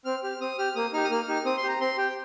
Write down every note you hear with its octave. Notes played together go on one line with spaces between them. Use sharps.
C4 F6
G4 F6
C4 D#6
G4 F6
A#3 D#6
D#4 G4 F6
D#6
A#3 F6
D#4 G4
C4 D#6
C6
G4
A#5
C4 C6
G4 G5